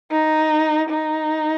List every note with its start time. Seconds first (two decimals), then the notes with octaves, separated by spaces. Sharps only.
0.11 D#4
0.89 D#4